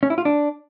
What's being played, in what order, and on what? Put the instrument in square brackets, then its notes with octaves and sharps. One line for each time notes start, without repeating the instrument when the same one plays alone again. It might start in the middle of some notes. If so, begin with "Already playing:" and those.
[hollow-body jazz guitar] C#4
E4
F4
D4